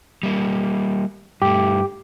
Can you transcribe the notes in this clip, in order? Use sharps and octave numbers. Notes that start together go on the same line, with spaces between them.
G3 A#3
G2 A3 G4